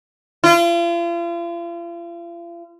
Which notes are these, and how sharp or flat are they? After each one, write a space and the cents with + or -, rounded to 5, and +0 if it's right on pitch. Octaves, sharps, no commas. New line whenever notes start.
F4 -40